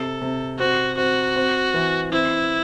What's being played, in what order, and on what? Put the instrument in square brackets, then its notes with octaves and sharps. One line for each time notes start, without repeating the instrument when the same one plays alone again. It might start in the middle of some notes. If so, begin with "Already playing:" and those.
Already playing: [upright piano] C3 [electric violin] A4
[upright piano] C3
[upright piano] C4 [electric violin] F#4
[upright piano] C4 [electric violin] F#4
[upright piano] C4
E3
[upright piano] C4 [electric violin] E4